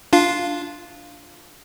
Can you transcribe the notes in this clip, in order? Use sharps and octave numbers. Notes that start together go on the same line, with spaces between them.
D4 F4 F5